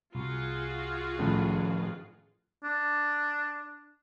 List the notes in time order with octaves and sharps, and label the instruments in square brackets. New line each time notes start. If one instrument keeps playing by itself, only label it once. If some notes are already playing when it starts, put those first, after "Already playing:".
[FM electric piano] C2 [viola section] F4 F#4 G#4
[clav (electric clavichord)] A2 [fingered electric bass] D#3 F3 C#4
[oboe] D4